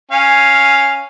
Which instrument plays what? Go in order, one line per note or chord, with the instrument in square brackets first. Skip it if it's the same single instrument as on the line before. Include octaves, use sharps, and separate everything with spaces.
[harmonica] C#4 F5 G#5